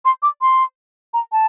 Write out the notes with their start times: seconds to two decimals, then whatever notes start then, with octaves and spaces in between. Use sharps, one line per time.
0.05 C6
0.23 D6
0.42 C6
1.14 A#5
1.32 A5